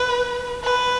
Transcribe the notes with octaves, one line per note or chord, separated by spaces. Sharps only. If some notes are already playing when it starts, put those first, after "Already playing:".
Already playing: B4
B4